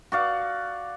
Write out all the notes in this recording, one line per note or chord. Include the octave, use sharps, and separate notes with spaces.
F#4 D5 F5